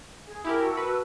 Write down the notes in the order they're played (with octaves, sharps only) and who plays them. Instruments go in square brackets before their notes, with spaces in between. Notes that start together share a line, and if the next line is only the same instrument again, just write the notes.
[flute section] G#4 G#5
[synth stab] E4 G4 A#4
[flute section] F#4 A5 E6
[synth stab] B4